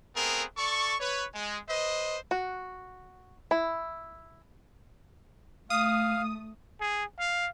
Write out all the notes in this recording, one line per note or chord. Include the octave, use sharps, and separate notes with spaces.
A3 B3 C4 G#4 A#4
A4 D5 C#6
B4 C#5
G#3
B4 C5 D#5
F#4
E4
A3 F5 D#6
G#4
F5